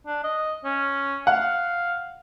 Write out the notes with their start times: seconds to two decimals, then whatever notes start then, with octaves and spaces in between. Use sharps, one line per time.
0.07 D4
0.24 D#5
0.65 C#4
1.27 F5 F#5